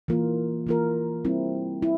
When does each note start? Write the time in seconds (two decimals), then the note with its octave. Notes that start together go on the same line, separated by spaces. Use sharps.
0.08 E3 A#3 F4 A#4
0.67 E3 A#3 F4 A#4
1.25 G3 C4 E4
1.82 E4